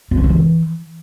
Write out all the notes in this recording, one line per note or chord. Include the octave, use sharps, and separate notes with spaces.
F4
C#4
A3
E3